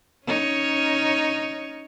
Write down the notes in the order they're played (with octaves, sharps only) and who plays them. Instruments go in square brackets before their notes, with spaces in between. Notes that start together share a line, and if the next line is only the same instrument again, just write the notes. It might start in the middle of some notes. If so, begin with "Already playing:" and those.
[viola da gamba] C#4 D#4 C#5